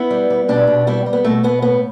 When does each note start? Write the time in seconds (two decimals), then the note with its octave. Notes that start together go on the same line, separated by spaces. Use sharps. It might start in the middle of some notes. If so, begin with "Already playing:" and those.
Already playing: B3 E4
0.10 G3
0.30 G3
0.48 B2 D4 G4
0.68 B2
0.87 G3 B3 E4
1.06 G3
1.13 B3
1.25 B2 A3
1.43 B2 B3
1.62 A2 B3